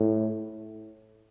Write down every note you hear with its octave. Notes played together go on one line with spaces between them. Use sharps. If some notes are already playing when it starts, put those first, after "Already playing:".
Already playing: A2